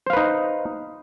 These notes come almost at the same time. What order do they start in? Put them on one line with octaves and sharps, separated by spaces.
C5 F5 B4 D#4